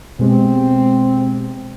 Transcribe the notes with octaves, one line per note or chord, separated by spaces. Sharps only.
B2 G#3 C4 G4